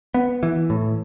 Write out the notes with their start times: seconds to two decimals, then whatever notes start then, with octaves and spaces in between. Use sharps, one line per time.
0.14 B3
0.43 E3
0.70 A2